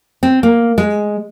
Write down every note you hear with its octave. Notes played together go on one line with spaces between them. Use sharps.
C4
A#3
G#3